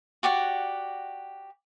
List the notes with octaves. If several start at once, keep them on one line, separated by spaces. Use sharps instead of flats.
F#4 G4 D5 F#5